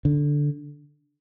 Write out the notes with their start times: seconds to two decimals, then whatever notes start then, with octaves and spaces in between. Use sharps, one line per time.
0.05 D3